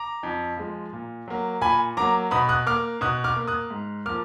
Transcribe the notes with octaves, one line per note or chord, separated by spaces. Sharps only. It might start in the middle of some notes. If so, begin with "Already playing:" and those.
Already playing: A#5 D6
F2
F3 G#3
A#2
F#3 A#3
A#2 G#5 B5
F#3 A#3 A#5 D6
B2 B5 D#6
D#6 F#6
A#3 D6 F6
B2 D#6 F#6
D6 F6
A#3
D#6 F#6
G#2
F3 A#3 D6 F6